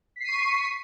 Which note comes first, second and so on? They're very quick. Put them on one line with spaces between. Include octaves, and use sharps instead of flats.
B6 C7 D#7 C#6